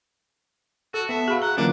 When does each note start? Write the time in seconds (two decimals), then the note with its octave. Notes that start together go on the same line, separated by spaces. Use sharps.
0.94 F#4 A4
1.09 B3 E5 A5
1.28 F#4 G#4 F5 B5
1.42 F#5 A#5
1.57 D3 E3 F#3 A#3 C#4 D4 F4